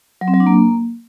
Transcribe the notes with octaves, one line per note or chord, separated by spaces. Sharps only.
F#3
C4
F#3
D4
A#3